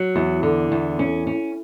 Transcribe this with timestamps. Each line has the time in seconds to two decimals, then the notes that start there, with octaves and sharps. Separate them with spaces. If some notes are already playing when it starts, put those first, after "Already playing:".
Already playing: F#3
0.16 E2
0.43 D3
0.72 E2
0.99 C#4
1.27 C#4